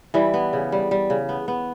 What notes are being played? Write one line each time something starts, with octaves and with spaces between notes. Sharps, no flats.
E3 G3 E4
B3
C#3
G3
G3
C#3
B3
B3